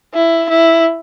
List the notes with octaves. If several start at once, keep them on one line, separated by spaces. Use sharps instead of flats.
E4
E4